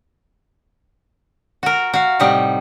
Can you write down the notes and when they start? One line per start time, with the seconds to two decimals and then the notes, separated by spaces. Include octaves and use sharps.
1.63 F#4 A#4
1.93 F#4 F5
2.19 A2 C3 G3 D#4 F#5